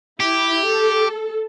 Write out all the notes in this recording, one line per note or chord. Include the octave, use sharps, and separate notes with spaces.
E4 G4
A4